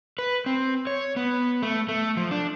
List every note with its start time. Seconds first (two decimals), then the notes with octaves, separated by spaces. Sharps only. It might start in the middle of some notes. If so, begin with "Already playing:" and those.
0.19 B4
0.46 C4
0.87 C#5
1.16 B3
1.62 A3
1.89 A3
2.17 F3
2.31 D4